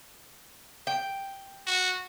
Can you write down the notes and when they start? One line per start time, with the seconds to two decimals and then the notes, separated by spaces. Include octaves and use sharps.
0.87 G5
1.67 F#4